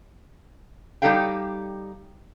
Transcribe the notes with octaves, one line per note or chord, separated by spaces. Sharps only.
G3 D#4 G4 A4 F5 G5